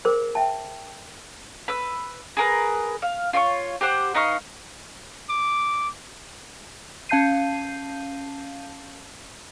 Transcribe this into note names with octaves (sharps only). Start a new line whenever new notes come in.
G#4 A#4 C5
E5 G5 A5
B4 E6
G#4 A#4 B4
F5
F4 C#5 E5 C#6
G4 C5 F#5 D6
B3 D#4 F5 C#6
D6
C#4 F5 A5 G6 C7 D#7